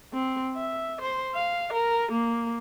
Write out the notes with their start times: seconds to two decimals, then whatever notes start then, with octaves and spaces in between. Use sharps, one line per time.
0.14 C4
0.56 E5
1.01 C5
1.35 F5
1.73 A#4
2.12 A#3